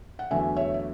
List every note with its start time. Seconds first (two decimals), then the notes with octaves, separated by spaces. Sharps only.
0.19 F#5
0.31 E2 D3 F#3 A3 E5 G#5
0.56 C#5 E5
0.74 E5